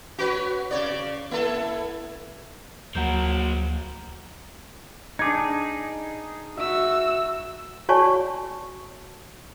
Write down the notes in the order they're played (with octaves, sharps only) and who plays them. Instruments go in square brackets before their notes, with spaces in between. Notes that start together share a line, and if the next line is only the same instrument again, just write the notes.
[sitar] F#4 B4 C#5
C#3 C#5 D5
A#3 E4 A4
[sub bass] D2 [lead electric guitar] F3 A#3 [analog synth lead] F#3 [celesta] F#5 A#5 G6
[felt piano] D4 D6 G#6 [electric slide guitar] D#4 G#4
[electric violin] F#4 E6 [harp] E5
[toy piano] F#4 C#5 D5 G#5 A5 C#6